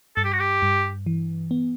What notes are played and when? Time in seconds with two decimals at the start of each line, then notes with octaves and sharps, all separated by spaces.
0.16 G2 A4
0.24 G4
0.33 F#4
0.40 G4
0.62 G2
1.06 E3
1.51 B3